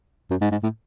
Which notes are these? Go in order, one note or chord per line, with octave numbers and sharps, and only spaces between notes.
F#2
G#2
G#2
A2